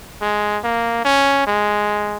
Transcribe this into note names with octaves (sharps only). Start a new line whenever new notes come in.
G#3
A#3
C#4
G#3